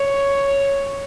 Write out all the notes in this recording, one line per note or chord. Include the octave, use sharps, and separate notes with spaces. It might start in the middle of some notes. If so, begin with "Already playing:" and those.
Already playing: C#5